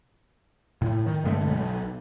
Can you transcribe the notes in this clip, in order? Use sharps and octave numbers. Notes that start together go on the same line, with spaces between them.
A2
D#3
G2 D3 G#3 A3
B1